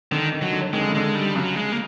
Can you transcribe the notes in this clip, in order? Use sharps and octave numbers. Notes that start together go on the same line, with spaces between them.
D3 D#3
D#3
F#3
D3
D#3 G#3
D3
C#3
D3 G#3
G3
C#3 F#3
G#3
A#3